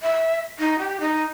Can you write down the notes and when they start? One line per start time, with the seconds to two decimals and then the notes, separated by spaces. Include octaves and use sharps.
0.02 E5
0.59 D#4
0.78 G4
1.00 D#4